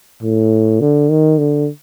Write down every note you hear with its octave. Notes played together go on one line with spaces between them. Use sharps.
A2
D3
D#3
D3